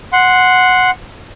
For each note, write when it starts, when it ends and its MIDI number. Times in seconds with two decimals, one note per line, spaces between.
0.13 0.90 78
0.13 0.90 84